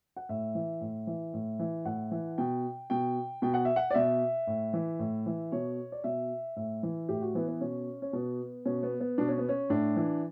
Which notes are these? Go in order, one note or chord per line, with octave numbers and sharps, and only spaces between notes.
F#5
A2 E5
E3
A2
E3
A2
E3
A2 F#5
E3
B2 G5
B2 G5
B2 G5
F#5
E5
F#5
D5
B2 E5
A2
E3
A2
E3
B2 C#5
D5
B2 E5
A2 E5
E3
A2 G4
F#4
E3 B3
B3
B2 C#4
C#4
B2 B3
B2 C#4
B3
B3
B2 D4
C#4
B3
C#4
A2 D4
E3